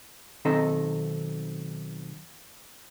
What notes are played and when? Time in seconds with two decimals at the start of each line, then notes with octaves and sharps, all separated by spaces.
0.45 B1 D#3 C4 A4 D#5 A#5